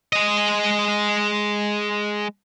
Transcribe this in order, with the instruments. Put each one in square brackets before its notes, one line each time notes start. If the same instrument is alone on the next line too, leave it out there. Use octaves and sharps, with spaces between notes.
[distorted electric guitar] G#3 D#5